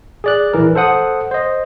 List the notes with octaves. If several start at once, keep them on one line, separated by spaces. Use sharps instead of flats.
G#4 D5 F#6
A#1 E3 A#4
A4 C5 F#5 D#6
C5 D#5